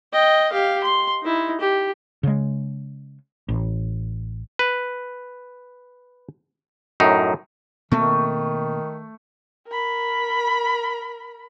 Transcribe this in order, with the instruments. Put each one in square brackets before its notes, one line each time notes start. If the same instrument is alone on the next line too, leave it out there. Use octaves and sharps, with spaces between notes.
[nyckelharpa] D#5 G5
G4 F5
C6
D#4 E4
G4
[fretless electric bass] C#3 G#3
A1
[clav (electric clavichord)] B4
F#2 A2 D#4
[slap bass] B2 A#3 C4 [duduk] D#3 [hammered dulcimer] A3
[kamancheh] A#4 B5